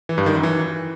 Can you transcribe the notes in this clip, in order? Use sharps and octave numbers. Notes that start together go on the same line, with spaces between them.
E3
G2
D#3
F#2
E3